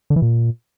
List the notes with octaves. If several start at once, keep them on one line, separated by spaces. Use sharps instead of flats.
D3
E3
A#2